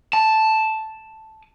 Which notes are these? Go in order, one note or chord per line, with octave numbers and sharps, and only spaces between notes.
A5